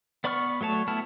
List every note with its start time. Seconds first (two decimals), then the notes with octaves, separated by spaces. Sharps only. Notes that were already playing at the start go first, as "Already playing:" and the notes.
0.24 B3 D5 B5 C#6 F6
0.61 F#3 A3 C#5 A5
0.87 A3 B3 E4 A5 F6